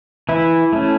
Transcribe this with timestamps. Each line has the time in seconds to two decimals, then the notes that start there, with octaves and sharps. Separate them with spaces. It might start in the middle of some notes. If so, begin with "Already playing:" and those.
0.29 E3 E4
0.73 A3 C#4